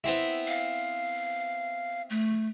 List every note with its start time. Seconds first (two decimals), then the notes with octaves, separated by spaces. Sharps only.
0.04 B3 C4 E4
0.47 F5
2.10 A3